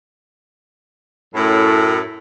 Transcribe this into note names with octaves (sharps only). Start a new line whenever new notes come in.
F#2 A2